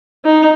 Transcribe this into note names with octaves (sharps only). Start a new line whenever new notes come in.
D#4